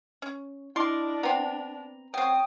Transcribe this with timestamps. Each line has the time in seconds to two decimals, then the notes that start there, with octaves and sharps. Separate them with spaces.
0.22 C#4
0.76 D4 E4 D#5 C6 D6
1.23 B3 C4 A#5
2.14 F#3 C4 C#5 G5 D#6